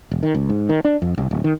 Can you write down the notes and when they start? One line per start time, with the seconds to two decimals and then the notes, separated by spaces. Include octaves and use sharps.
0.11 E1
0.23 D#3
0.34 C#2
0.49 G#2
0.69 D#3
0.85 D4
1.02 F2
1.17 C2
1.31 D1
1.44 D#3